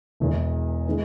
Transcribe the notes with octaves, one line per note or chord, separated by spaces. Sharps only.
E1 E2 E3
E3 G#3